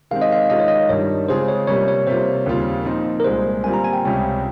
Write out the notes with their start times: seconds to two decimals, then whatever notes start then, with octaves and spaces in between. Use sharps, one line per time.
0.11 D#3 G#3 C4 F5
0.22 D#5
0.32 F5
0.50 D#3 G#3 C#4 F4 D#5
0.60 C#5
0.68 D#5
0.89 G2 D#3 G3 C#5
1.28 C#3 G#3 C4 F4 G#4 C5
1.48 C#5
1.67 C3 G3 A#3 C#4 C#5
1.88 C#5
2.07 C3 G3 A#3 F4 C5
2.46 D#2 C#3 G3 C4 F4
2.85 A#2 F3 C4 D#4
3.20 A#4
3.24 C2 A#2 G#3 C5
3.64 A#2 G3 C4 F4 G#5
3.74 A#5
3.84 G#5
3.93 G5
4.04 C#2 C3 G3 C#4 F4